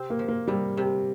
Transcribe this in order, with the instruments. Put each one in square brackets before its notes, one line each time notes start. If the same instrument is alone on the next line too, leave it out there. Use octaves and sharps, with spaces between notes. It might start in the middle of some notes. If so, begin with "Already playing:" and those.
Already playing: [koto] C3 C4
[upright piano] A#3
[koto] F3
[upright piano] A#3
[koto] C3 [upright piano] G3
[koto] C3